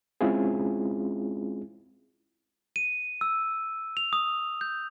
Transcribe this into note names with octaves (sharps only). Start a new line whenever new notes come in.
G#3 C4 C#4 E4 F4 G#4
D#7
E6
F7
D#6
G6